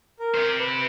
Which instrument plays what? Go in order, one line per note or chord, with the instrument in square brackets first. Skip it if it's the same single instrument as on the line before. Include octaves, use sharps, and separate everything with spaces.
[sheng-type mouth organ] A#4
[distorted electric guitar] C3 C5
[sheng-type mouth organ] B4